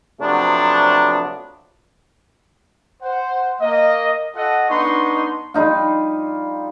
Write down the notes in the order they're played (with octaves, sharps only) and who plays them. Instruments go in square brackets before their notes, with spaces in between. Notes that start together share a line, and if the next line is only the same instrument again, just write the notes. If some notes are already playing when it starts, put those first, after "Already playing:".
[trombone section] C3 F3 F#3 A3 B3 D4
[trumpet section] C5 F#5
A#3 D#5
F4 A4 D#5 F#5
B3 D4 D#4 C6 C#6
[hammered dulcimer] G3 D#4 F4